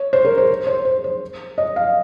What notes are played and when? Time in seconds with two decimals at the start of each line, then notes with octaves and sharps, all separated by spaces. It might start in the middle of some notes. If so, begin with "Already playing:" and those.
Already playing: C#5
0.13 C5
0.25 A#4
0.38 C5
0.67 C5
0.85 C5
1.04 C5
1.58 D#5
1.76 F5